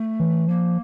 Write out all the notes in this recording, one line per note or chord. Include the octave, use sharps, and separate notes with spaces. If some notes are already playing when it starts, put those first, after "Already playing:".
Already playing: A3
E3
F3 A#3